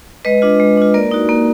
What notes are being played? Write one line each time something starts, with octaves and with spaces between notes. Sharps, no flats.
G#3 B4 D#5
D4 F4
G#3
D4 F4
A#3 A#4 D5
D#4 F#4
A#3